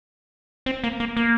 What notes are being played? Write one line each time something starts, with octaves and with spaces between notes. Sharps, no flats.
C4
A#3
A#3
A#3